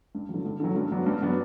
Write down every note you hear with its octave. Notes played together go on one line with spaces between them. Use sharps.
G2
F#3
D3
G2
D3 F#3
G2
F#3 B3 D4
G2
F#3 B3 D4